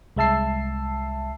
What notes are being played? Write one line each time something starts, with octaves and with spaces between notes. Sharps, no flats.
C2 G#3 E5 A5 E6 C7